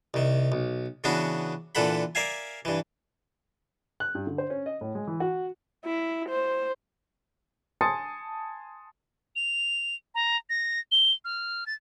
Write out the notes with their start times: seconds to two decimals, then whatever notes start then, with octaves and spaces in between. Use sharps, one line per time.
0.14 C2 D#3
0.52 B1
1.04 C#3 E3 B3 D4 F#4
1.75 A#2 D3 E3 A4 F#5 B5
2.15 A#4 D5 E5 F5 G#5
2.65 G2 E3
4.00 F#6
4.15 G2
4.27 D3
4.38 C5
4.50 C#4
4.66 D#5
4.81 A2
4.95 G#3
5.07 E3
5.20 F#4
5.85 E4
6.29 C5
7.81 G#5 A5 C6 D#6 A6 C#7
9.36 F7
10.15 A#5
10.50 A#6
10.92 G7
11.25 F6
11.66 A6